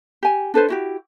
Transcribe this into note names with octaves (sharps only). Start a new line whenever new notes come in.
G4 G#5
D4 A4 B4 C5
E4 F#4 G4